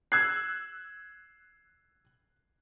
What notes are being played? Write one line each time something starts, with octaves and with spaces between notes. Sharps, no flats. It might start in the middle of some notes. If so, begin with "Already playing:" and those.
E6 F#6 G#6 C7